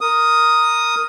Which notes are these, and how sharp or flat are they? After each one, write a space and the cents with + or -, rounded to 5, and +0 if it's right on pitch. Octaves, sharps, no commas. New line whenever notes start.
A#4 +0 D#6 +0